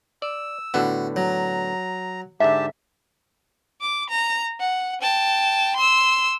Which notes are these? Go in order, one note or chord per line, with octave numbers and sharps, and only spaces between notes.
D5 E6
A2 D3 B3 F#4
F#3 A#5
G#2 D3 G4 E5 A5
D6
A#5
F#5
G5 A5
C6 E6